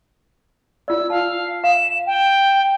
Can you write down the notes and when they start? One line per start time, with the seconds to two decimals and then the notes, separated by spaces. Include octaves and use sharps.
0.88 F4 D5 E6
1.10 F5 A5
1.64 F5 E7
2.06 G5